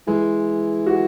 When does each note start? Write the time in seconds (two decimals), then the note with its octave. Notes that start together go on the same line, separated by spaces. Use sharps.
0.07 E3 G#3
0.86 F#4